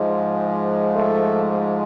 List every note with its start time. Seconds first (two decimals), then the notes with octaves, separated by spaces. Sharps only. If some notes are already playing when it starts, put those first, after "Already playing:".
Already playing: G#2 F3 G#3
0.95 A3